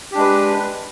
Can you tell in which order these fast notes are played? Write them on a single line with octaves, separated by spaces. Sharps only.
G4 D4 G#3 B4